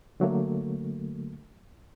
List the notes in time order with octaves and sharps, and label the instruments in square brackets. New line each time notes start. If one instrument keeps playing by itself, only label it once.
[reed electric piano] D3 F#3 A3 A#3